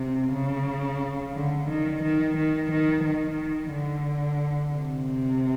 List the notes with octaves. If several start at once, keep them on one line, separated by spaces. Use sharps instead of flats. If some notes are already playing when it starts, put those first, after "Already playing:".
Already playing: C3
C#3
D3
D#3
D#3
D#3
D#3
D#3
D3
C3